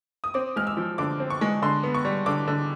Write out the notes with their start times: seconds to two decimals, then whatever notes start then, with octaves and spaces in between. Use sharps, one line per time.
0.24 D#6
0.34 C4 D6
0.56 G#3 F6
0.67 E6
0.77 F3
0.98 D3 D6
1.20 C4
1.30 C#6
1.41 G#3
1.62 D3 C6
1.83 B3
1.95 C#6
2.05 G3
2.26 D3 D6
2.47 D3